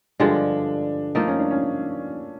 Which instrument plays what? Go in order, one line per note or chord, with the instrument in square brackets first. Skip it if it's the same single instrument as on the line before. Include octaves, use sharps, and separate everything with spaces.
[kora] G2 D3 F3 G#3 [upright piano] D4
[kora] F3 A#3 D#4 [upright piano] A3
[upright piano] C#4
D4
C#4